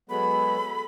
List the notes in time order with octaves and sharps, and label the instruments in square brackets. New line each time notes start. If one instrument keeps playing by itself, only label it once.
[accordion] F#3 G#3 B3 [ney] A4 [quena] B5